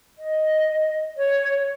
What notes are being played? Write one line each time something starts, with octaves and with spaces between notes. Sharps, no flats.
D#5
C#5